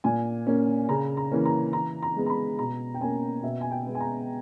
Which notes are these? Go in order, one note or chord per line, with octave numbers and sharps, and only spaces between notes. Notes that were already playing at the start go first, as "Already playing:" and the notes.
A#2 G#5
A#3 C#4
C#3 A#5
A#5
E3 A#3 C#4
A#5
E3 A#5
A#5
G#3 B3
A#5
B5
B2 A#5
G5
A#3 C#4 G#5
B2 E5
G#5
G5
G#3 B3
G#5
A#5